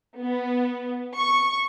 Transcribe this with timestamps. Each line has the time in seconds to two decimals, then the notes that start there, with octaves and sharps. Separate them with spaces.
0.18 B3
1.15 C#6